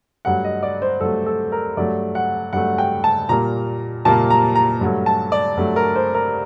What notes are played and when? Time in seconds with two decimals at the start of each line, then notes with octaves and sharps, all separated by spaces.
0.25 G2 F#3 A3 F#5
0.44 D#5
0.63 D5
0.82 C5
1.01 G2 F#3 A3 A4
1.26 A4
1.52 A#4
1.77 G2 F#3 A3 D5
2.15 F#5
2.53 G2 F#3 A3 F#5
2.78 G5
3.04 A5
3.29 A#2 G3 A#3 A#5
4.05 A#2 G3 A#3 A5
4.30 A#5
4.55 A#5
4.81 G2 F#3 A3
5.06 A5
5.32 D5
5.57 G2 F#3 A3
5.76 A#4
5.96 C5
6.14 A#4